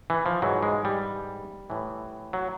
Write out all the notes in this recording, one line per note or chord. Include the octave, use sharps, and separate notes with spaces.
E3
F3
G#2 E3 F#3
G#3
G3
A2 E3
F#3